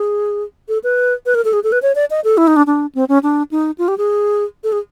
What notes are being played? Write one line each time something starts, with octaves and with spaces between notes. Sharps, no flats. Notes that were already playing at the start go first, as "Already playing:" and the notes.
Already playing: G#4
A4
B4
B4
A#4
A4
G#4
A4
B4
C#5
D5
D#5
A4
E4
D#4
D4
D4
C4
C#4
D4
D#4
F4
G4
G#4
A4
G#4